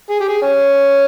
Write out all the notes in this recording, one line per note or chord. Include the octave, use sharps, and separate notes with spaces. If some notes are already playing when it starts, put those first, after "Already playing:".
G#4
G4
G#4
C#4